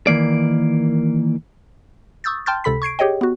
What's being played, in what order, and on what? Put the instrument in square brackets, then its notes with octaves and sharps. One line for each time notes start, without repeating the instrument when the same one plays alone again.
[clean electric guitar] D#3 E3 A#3 D5
[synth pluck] C#6 D#6 E6 G6 A6
G5 A5 C6 F6 G6 A6
C#2 C3 A4 B5 B6
C#6 G#6 C7 D7
G4 G#4 C#5 D#5 G5
B3 F#4